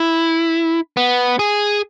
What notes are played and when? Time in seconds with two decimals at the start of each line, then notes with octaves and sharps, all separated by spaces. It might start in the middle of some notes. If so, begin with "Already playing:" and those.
Already playing: E4
0.97 B3
1.39 G#4